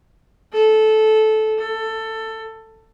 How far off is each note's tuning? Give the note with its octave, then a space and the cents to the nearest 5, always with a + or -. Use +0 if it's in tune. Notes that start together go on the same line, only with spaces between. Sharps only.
A4 -15
A4 +15